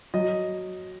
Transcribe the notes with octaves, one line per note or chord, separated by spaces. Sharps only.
F#3 D#5